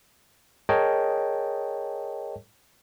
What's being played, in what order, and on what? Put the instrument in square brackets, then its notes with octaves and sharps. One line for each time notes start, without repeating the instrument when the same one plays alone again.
[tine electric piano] G#4 A#4 C#5 D#5 G5 A5